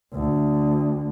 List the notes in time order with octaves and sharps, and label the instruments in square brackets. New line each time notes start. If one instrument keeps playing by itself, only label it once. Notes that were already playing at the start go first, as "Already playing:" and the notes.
[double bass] D2